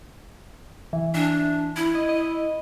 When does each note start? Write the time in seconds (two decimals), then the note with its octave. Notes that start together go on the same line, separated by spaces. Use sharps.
0.93 E3
1.15 E3 D4
1.76 E4
1.95 D#5
2.09 D#5